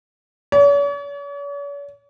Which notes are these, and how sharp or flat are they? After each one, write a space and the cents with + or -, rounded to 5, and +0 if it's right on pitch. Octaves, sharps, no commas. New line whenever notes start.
C#5 +45